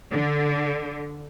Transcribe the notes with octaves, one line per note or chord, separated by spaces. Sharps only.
D3